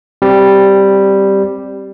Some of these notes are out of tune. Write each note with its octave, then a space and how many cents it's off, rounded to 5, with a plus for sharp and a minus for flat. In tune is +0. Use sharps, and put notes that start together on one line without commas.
G3 +0 C4 +10